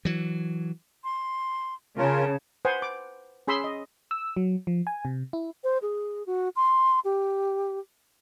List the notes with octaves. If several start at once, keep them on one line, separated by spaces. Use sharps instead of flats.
E3 F#3
C6
C#3 C#4 F4 A#4 A5
B4 C5 F#5 G#5
D6
C#4 G#4 B5 C6 E6
D#5
E6
F#3
F3
G#5
C3
E4
C5
G#4
F#4
C6
G4